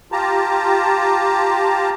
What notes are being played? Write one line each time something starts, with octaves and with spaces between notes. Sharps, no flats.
F4 G4 A5 A#5